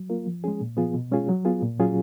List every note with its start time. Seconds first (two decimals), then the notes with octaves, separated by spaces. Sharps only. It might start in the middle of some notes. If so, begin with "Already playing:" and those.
Already playing: F#3
0.10 A#3 F4 A#4
0.26 F3
0.44 G#3 C#4 G#4
0.61 A#2
0.77 F3 B3 F4 G#4
0.94 B2
1.12 G#3 C#4 F4 G#4
1.29 F#3
1.45 B3 F4 G#4
1.63 A#2
1.79 F#3 C#4 F4 G#4